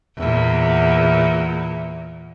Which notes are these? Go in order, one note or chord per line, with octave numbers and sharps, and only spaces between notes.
E2 A#2